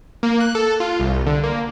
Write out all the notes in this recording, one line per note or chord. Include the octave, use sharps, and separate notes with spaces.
A#3
F#6
A4
F4
C2
D3
A#3